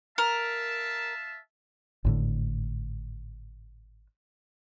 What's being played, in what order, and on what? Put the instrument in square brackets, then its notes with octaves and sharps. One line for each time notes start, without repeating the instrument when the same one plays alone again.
[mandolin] A#4 [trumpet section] E5 F5 A5
[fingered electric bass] G#1 A2 D3